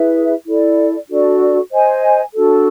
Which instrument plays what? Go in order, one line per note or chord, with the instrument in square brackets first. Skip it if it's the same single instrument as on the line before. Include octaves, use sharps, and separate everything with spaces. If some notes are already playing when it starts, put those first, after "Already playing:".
Already playing: [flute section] E4 G#4 B4 E5
E4 A4 D5
D4 F#4 A4 D5
C5 D#5 G#5
D4 F#4 A4